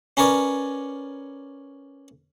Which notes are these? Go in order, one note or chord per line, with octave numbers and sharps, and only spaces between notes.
C#4 A#4 B4 C#5 D5